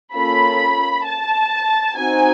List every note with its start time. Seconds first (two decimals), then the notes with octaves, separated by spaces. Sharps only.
0.15 A#3 C#4 F4 A4 B5
1.06 A5
1.96 C4 D#4 F#4 G#5